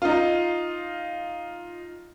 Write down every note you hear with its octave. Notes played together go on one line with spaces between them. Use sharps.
D#4 F4